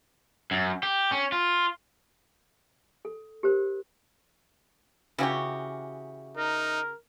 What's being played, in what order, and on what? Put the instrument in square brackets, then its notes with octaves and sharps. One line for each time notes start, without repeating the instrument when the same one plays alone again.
[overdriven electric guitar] F#2
G4
C#4
F4
[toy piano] A4
G4 A#4 C5
[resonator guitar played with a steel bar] C#3 F#4 [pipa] E3 C#4 G4
[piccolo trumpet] D#4 [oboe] A#4